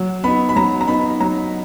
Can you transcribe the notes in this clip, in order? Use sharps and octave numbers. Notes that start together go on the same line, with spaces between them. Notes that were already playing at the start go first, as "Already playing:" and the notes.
Already playing: F#3
B3 D#4 B5
B5
F#3 A#5
A#5
B3 D#4 B5
F#3 A#5